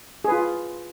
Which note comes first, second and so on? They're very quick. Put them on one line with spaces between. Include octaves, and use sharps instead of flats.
G#4 B4 F4